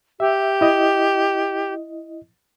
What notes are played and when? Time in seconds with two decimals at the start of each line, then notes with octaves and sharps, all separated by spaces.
0.20 G4 E5
0.61 E4 D#5